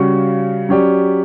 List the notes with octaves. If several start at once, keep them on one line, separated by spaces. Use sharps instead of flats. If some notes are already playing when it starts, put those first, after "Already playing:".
Already playing: C#3 G3 C#4 F#4
F#3 C#4 G4 D5